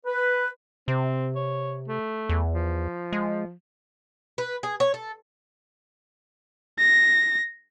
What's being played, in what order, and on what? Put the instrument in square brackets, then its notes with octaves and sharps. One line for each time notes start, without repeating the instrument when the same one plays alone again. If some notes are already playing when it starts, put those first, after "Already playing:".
[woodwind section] B4
[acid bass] C3 [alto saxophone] C4
[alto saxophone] C#5
A3
[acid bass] E2
[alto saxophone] F3
[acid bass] G#3
[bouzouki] B4
G#4
C#5
A4
[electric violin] A#6